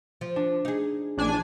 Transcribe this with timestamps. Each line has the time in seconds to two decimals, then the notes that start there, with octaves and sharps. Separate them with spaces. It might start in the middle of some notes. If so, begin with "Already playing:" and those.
0.21 F3
0.36 D4
0.65 D#4 G#4
1.17 A#1 D4 G#5